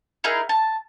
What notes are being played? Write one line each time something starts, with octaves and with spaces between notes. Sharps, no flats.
D#4 E4 G#4 A#4
A5